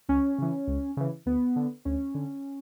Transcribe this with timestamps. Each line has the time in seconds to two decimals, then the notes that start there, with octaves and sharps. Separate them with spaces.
0.09 C#2 C#4
0.38 C#3 E3
0.67 C#2
0.97 C#3 E3
1.26 D2 B3
1.56 D3
1.85 D2 C#4
2.15 D3